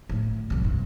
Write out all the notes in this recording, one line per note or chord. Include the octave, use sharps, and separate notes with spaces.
A2 D3
C2 F#3
G2